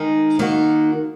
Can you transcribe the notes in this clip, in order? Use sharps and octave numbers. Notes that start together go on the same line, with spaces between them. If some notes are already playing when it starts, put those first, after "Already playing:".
Already playing: D#3 G#3 D#4
D#3 A#3 D#4 F#4